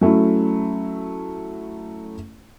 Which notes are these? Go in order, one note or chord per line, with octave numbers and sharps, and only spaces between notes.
F#3 A3 C#4 E4